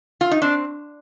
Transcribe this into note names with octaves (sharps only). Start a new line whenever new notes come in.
F4
D#4
C4 D4